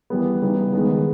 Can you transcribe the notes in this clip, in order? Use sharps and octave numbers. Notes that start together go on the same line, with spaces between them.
E3 G3 B3
C#3 G3 B3 D#4
D#3 G#3 B3